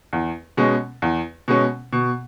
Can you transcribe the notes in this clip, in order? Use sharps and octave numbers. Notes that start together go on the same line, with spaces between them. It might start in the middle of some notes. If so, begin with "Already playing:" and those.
E2
B2 G#3 C#4
E2
B2 G#3 C#4
B2